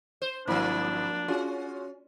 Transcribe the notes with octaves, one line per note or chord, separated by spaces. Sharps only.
C5
G#1 F3 A#3 D4 E4 B5
C#4 F4 F#4 G#4